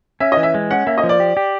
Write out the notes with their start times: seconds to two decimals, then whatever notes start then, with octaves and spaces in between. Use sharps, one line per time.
0.20 C#4 E5
0.32 D#5
0.37 E3
0.43 E5
0.54 G#3
0.71 C#4 F#5
0.87 A#3 E5
0.98 D#5
1.03 F3
1.09 D5
1.20 G4
1.37 G4